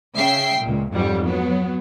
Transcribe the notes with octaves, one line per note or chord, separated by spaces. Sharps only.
C#3 E5 G5 C7
C#2 A#2
F2 G#2 F#3 G3
F#3 B3